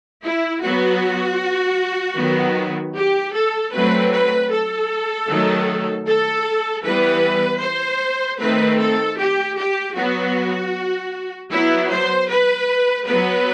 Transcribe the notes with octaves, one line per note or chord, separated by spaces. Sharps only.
E4
F#3 B3 F#4
D#3 F#3 B3
G4
A4
F#3 A3 C4 B4
B4
A4
D#3 F#3 A3
A4
E3 G3 B3 B4
C5
D#3 A3 C4 B4
A4
G4
G4
F#3 B3 F#4
F#3 B3 E4
C5
B4
F#3 B3 B4